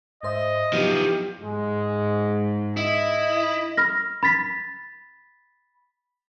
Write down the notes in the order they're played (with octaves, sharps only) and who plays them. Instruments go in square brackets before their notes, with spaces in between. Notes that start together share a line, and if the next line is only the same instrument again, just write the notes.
[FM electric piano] G#2 C5 E5 [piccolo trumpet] D#5
[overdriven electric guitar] F3 D#4 [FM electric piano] F#3 B3 E4 [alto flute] G4
[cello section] G#2 [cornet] G#3
[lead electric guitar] E4 [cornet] D#5
[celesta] B5 F6 A#6
B5 A6 B6